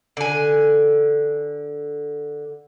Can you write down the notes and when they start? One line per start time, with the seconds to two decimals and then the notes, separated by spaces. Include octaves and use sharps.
0.17 D3 G#5